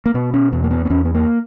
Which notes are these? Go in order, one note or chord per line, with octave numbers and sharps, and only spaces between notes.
A#3
B2 B3
C#4
E2 B3
A#3
B3
B3
E2 C#4
B3
A#3